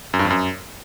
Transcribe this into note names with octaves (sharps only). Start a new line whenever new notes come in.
F#2
G2
F2
F#2